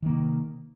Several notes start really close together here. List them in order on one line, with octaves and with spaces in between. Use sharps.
D#3 A#3 C3